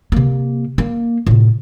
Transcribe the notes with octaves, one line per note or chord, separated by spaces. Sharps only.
C3 A#3
A#3
A2 C3